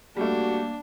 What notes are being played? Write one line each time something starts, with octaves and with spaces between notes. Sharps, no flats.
G3 A3 A#3 D4 F#4